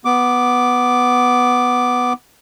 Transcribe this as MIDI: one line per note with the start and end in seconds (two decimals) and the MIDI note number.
0.05 2.13 59
0.05 2.13 86